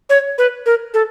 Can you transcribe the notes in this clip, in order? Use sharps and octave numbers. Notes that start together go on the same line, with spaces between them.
C#5
B4
A#4
A4